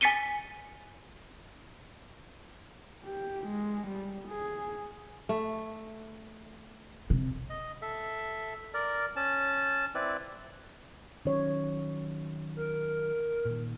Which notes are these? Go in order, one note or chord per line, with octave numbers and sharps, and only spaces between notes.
G#5 A6 B6 C#7 D#7 G7
G4
G#3
G3
G#4
A3
C3
D#5
A4 E5
A#4 D5
C#4 A5
C4 E4 B4 D5
D#3 F#3 C#4 C#5
A#4
A#2 D#3